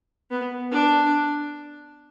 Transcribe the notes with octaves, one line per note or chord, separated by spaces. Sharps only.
B3
D4